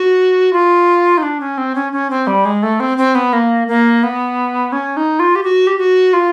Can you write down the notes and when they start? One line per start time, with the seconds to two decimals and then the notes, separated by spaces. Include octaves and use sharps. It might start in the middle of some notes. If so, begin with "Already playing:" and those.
Already playing: F#4
0.53 F4
1.18 D#4
1.23 D4
1.40 C#4
1.58 C4
1.75 C#4
1.93 C#4
2.10 C4
2.27 G3
2.45 G#3
2.63 A3
2.80 C4
2.98 C4
3.15 B3
3.33 A#3
3.68 A#3
4.03 B3
4.72 C#4
4.97 D#4
5.19 F4
5.36 G4
5.43 F#4
5.67 G4
5.78 F#4
6.13 F4